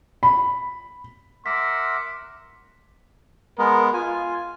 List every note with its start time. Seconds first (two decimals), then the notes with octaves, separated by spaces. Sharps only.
0.23 B5
1.46 A#4 E5 F#5 C6 D6 B6
3.59 G#3 B3 A#4
3.94 F4 G#5